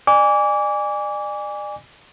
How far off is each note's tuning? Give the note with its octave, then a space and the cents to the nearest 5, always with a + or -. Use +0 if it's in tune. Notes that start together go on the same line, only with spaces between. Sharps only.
D5 +40 G#5 -20 D6 -30